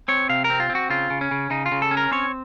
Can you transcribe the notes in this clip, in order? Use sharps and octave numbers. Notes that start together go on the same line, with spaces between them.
C4 C#5
C3 F5
A#4
C4
F4
C4
F#4
C#3 F4
C#3
C#4
C#3
C#3 D#4
F4
C#3
A4
C#4
A#4
C4 C#5